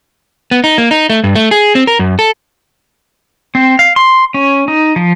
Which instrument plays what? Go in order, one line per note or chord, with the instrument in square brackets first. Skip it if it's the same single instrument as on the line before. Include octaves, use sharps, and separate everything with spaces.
[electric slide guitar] B3
D#4
A#3
D#4
A3
G2
A3
G#4
C4
A#4
F#2
A4
[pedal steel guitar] C4
F5
C6
C#4
D#4
F3